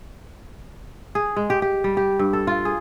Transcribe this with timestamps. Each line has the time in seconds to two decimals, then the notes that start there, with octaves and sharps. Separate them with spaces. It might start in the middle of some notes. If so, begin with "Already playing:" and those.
1.15 G#4
1.36 G#3
1.50 G4
1.62 G4
1.84 G3
1.97 G4
2.19 G2
2.33 A4
2.47 F4
2.65 G#4